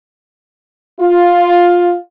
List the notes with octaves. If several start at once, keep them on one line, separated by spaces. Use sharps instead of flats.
F4